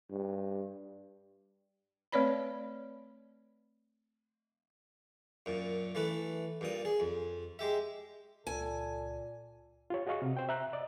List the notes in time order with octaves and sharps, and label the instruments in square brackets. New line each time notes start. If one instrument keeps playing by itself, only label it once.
[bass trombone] G2
[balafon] A3 C4 B4 C#5 D5 B5
[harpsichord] F#2 A#2
E3 A3 B4
G2 A#2 D#6
G#4
F2
G#3 G4 E5
[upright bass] C#2 [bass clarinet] A#2 [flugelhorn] A4 [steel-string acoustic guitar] G#5
[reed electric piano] F4 G4 C#5
F#4 G#4 D#5 F5 C#6
C3
C5 G5
E5 A#5 F#6
D5 D#5